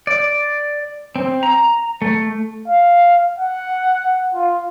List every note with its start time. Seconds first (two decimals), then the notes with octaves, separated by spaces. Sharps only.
0.07 D5
1.16 C4
1.43 A#5
2.02 A3
2.68 F5
3.39 F#5
4.34 F4